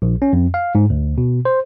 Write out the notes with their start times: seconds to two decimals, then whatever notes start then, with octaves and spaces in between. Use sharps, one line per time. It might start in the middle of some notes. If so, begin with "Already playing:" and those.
0.02 A#1
0.22 C#4
0.33 F2
0.54 F5
0.75 G#2
0.90 D2
1.18 B2
1.45 C5